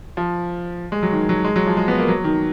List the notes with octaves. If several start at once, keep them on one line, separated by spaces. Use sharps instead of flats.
F3
G#3
F#3
D#3
F#3
G#3
F#3
F3
G#3
B3
A#3
F#3
D#3